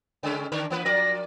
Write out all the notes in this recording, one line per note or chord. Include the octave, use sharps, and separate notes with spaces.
C#3 G#3 C#4
D3 D4 A#4
E3 A#3 B4
F3 A#4 D5 A#6